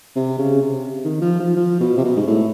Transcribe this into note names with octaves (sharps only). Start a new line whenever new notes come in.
C3
C#3
C3
D#3
F3
F3
F3
B2
C3
B2
G#2
A2